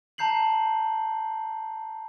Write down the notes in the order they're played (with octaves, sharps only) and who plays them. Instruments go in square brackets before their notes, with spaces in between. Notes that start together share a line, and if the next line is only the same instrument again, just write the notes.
[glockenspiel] A5 A#5 G6 C7 F#7